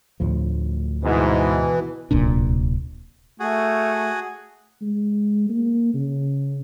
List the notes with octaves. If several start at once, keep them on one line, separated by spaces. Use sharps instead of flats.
D2 A2 F3
G#2 B2 E3
D1 C2 A#2 D4
A3 F#4 G#4
G#3
A#3
C#3